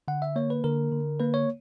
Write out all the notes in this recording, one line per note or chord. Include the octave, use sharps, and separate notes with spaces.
D3 F#5
E5
A#3 C#5
B4
D3 A#4
D3
A#3 B4
C#5